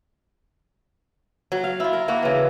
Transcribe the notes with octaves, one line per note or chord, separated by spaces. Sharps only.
F#3
F5
E4 F4
A#4
A#3 E4 F#4
C#3 E3